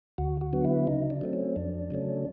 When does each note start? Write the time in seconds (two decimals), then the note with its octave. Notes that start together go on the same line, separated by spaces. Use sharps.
0.18 D2 F#4
0.41 F#4
0.53 D3 F#3 B3
0.65 E4
0.87 C#3 D#4
1.10 D4
1.21 F#3 A3 C4
1.33 C#4
1.56 F2 D4
1.91 C#3 F#3 A3 C#4